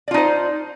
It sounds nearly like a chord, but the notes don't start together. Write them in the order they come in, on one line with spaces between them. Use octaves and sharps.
D5 F4 D#4 C5